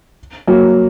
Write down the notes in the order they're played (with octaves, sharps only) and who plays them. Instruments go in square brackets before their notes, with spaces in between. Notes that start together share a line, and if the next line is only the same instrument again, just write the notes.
[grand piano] F#3 A#3